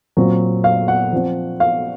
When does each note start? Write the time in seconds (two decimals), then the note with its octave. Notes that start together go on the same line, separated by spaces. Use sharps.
0.17 A#2 F#3 C4
0.64 F5
0.88 F#5
1.13 F3 C4
1.60 F5